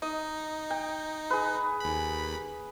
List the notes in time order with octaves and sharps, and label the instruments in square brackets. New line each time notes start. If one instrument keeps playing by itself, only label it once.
[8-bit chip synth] D#4 [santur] D#5
[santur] G5
G#4 B4
[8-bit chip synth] D#2 B5